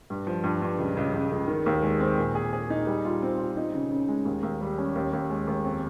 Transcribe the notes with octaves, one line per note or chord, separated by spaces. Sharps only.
G2
F3
G2
G2
C#2
C#2
C#2
C#2
D#3
D#2
G#3
C4
A#2
G#4
G#4
D#4
G3
F4
C4
F4
D#4
C#3
C#3
G#3
D#2
D#2
G3
C#4
D#2
D#2
G#3
D#2
F2